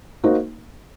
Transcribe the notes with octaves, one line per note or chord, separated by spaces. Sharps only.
A#3 D#4 F#4 C5